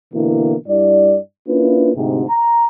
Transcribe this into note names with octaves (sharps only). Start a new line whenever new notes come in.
B2 D3 E3 A#3 E4
G2 G3 E4 D5
A#3 C#4 D4 E4 F4 B4
D2 G#2 C3
A#5